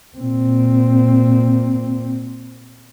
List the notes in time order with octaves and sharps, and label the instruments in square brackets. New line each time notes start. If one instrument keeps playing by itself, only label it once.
[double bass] A#2 C4